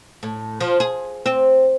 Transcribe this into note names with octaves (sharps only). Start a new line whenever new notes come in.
A2
F3
G#4
C4